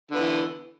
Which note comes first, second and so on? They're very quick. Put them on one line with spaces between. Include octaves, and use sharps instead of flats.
D3 B3 E3